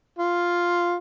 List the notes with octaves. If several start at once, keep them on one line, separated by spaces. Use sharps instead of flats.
F4